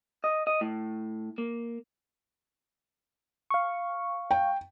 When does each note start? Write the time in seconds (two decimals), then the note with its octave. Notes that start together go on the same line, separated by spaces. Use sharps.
0.24 D#5
0.47 D#5
0.61 A2
1.38 A#3
3.50 F5 C#6
4.31 G5